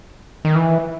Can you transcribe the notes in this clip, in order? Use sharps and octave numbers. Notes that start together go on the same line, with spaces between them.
D#3
E3